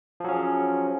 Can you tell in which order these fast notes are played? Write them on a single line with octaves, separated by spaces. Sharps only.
F3 F#3 C#4 G#4